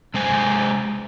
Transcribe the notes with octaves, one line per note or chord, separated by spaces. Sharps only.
C3 G#3 C5 G#5